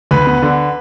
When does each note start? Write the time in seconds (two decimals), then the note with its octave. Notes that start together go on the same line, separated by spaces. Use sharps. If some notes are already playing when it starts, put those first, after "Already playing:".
0.11 D2 B4
0.27 B3
0.42 D3